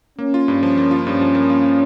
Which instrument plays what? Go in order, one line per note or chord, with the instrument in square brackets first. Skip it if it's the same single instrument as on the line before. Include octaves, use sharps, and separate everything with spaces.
[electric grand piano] A#3 [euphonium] C#4
[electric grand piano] F4
G2
F3
A#3
F4
[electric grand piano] G2 [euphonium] C#4
[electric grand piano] F3
A#3
F4